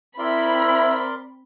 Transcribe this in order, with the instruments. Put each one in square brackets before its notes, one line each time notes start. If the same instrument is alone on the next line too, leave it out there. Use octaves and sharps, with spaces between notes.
[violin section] C4 B5 [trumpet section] E4 [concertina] A#4 D5 C6